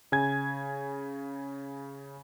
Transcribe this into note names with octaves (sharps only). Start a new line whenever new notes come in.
C#3 G#5 G#6